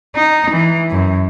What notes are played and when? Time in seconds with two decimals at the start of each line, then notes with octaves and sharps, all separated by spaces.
0.16 D#4
0.50 E3
0.90 F#2